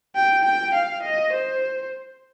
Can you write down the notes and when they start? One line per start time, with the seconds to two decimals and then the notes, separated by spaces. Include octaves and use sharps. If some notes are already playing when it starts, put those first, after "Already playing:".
0.15 G5
0.44 G5
0.74 F5
1.02 D#5
1.32 C5